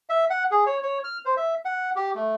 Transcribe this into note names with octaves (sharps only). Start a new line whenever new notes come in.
E5
F#5
G#4
C#5
C#5
F6
C5
E5
F#5
G4
A3